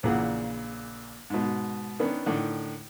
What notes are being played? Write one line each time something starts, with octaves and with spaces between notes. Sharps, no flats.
A#1 A#2 C#3 E3 G#4 F#5
G#2 B2
D#3 B3 C#4 D4
A2 D3 D#3